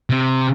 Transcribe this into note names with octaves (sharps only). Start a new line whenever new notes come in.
C3